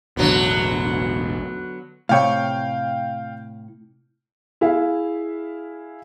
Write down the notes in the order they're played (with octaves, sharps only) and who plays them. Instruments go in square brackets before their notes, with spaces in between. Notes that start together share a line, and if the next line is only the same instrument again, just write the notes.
[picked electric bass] E1 A1 [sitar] D3 F#3 B3
[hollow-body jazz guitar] A2 C3 C#5 [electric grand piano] F5 G5
[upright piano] E4 G#4 E5 F5